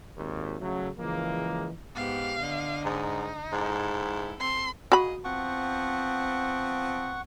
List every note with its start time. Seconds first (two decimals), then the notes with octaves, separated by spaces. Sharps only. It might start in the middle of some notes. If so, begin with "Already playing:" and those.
0.18 G#1 D#2
0.61 C#3 F#3 A3
0.98 C#3 E3 F3 G#3 A#3
1.96 G#2 B3 G4 F5
2.41 D3 D#5
2.85 G#2 D#4
3.52 G#2 E4 A4
4.40 C4 A4 C6
4.92 A#2 F#4 G#4 D#5 B5
5.25 F3 B3 C4 F#5 C#6